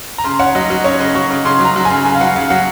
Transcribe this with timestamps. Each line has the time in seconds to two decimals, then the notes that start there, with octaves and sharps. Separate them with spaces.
0.18 A#5
0.24 C#3 C6
0.40 C#4 F#5
0.55 F#3 D#5
0.70 F#3 D#5
0.84 C#4 C#5
1.00 C#3 D#5
1.15 F#3 C#6
1.30 C#3 C#6
1.45 C#3 C6
1.60 F#3
1.65 A#5
1.76 F#3
1.85 G#5
1.90 C#3
2.05 C#3 G#5
2.15 F5
2.21 F#3 F#5
2.36 C#3 F5
2.50 F#3 F#5